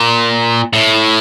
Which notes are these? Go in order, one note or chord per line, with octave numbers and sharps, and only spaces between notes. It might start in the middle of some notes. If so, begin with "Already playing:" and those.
Already playing: A#2
A2